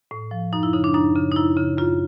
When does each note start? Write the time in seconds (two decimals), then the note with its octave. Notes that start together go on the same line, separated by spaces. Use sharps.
0.11 A2
0.31 F3
0.53 F#2 D#4
0.63 E4
0.73 C#3 D#4
0.84 D4
0.94 F#2 D#4
1.15 C#3
1.32 D#4
1.36 F#2 E4
1.57 C#3
1.78 F#2 F4